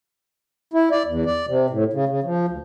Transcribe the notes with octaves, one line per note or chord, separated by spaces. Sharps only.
E4
D5
E2
D5
C3
A2
C#3
C#3
F3
D2